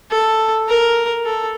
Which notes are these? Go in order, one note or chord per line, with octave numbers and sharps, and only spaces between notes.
A4
A#4
A4